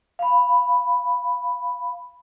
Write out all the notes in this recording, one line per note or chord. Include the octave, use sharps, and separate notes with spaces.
F5 B5